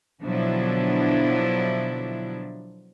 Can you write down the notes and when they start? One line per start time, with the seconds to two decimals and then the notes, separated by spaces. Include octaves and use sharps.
0.22 B2 D3 F3 F#3 D4 E4